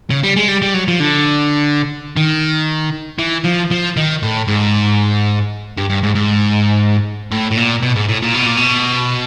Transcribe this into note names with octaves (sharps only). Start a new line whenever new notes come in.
C#3
G3
G#3
G3
G3
F#3
F3
D3
D#3
E3
F3
F3
D#3
A2
G#2
G2
G2
G#2
G#2
A2
A2
A#2
B2
G#2
A2
A#2
B2
A#2
B2